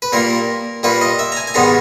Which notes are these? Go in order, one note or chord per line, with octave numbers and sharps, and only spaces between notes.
B4
A#2 G3 A#3 A#4
A#2 G3 A#3 B4
D#5
E5
A#5
G#5
G#5
G#2 D#3 G3 B3 A#5